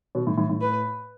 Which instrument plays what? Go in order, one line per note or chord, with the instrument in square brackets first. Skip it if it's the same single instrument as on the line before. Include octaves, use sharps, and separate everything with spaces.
[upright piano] B2
A2
A2
A2
[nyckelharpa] B4